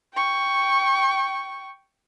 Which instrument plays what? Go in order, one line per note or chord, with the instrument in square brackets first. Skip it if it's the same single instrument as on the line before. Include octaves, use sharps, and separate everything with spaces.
[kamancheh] G5 C#6